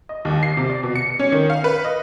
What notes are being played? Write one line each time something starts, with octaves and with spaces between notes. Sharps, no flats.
D#5
D#2
C7
C3
D5
B2
C#7
C#4
D#3
F5
B4
D#5